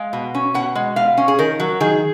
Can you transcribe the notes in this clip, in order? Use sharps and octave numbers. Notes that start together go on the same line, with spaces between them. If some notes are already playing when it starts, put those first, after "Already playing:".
Already playing: G#3 F5
B2
C#4
B2 F#5
G#3
B2 F5
C#4
G#4
D#3 A#4
F#3
D#3 G#4